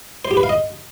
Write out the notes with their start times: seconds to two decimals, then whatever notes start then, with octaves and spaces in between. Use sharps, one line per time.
0.25 C5
0.31 G4
0.37 B4
0.43 F5
0.49 D#5